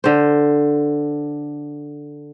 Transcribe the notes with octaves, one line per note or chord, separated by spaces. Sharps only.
D3 C5